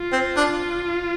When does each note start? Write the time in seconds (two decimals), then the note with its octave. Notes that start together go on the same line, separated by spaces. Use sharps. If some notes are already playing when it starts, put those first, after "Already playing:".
Already playing: F4
0.12 C4
0.37 D4